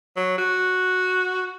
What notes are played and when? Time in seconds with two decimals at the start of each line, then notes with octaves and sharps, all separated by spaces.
0.16 F#3
0.38 F#4